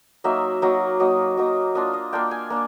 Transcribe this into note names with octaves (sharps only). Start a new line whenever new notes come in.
F#3 A#3 D#4 E5
F#3 A#3 D#4
F#3 A#3 D#4 D#5
F#3 A#3 D#4
A#3 D4 F4 D#5
D#5
A#3 D4 F4 G5
G#5
A#3 D4